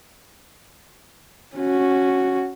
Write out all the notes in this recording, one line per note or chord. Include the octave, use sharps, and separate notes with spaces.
C#4 F#4